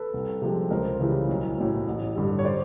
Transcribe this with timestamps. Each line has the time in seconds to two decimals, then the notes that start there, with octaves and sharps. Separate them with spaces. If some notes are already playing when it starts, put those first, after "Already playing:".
Already playing: A4 B4
0.14 C2
0.42 C3 F3 G#3
0.70 C#2 A#4 C5
1.00 C#3 E3 G3
1.29 B1
1.58 A2 F#3
1.87 A1
2.16 G2 D3 G3
2.39 C#5
2.45 C5 D5